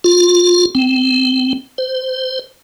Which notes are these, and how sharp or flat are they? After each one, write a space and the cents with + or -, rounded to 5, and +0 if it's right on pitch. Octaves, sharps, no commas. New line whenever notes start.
F4 +25
C4 -20
C5 -15